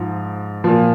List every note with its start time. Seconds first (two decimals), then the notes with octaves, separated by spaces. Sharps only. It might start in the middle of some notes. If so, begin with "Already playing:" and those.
Already playing: G#2 F3
0.64 A#2 F3